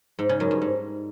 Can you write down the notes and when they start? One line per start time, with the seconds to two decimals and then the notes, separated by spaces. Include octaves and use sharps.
0.19 G#2
0.29 C#3
0.40 F#2
0.51 G2
0.62 G#2